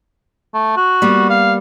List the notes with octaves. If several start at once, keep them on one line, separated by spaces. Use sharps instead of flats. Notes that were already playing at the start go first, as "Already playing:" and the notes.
A3
F#4
G3 A#3 B3
F5